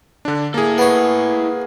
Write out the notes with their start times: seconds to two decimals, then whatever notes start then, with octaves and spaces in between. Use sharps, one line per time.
0.25 D3 D4
0.54 A#3 E4 G#4 A4
0.78 B3 C#5